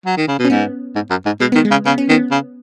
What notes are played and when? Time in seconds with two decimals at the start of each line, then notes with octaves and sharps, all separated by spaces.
0.06 F#3
0.17 D#3
0.28 C#3
0.39 B2
0.45 C#4
0.50 G#2 B3
0.95 G#2
1.10 F#2
1.26 G#2
1.40 B2 G#3
1.52 D#3 B3
1.65 G#3
1.71 C#3
1.85 C#3 B3
1.98 C#4
2.09 D#3 B3
2.31 C#3